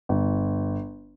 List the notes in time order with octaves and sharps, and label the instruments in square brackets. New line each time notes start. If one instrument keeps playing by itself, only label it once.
[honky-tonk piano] G1